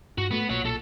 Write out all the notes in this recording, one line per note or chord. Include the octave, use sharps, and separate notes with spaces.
G2 F#4
A2 A3 B3
B1 A#2 C#5 F#5
A4